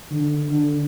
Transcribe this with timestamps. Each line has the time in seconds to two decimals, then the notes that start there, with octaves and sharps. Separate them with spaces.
0.11 D3
0.50 D3